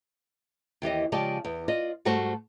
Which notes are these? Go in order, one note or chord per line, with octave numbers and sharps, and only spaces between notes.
D#2 E3 G4 D#5
C#3 F3 G#3 G4 D5 A5
E2
F4 D5 D#5
G#2 G3 A3 F#4 C5 A5